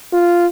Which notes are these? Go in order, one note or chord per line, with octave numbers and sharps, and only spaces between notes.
F4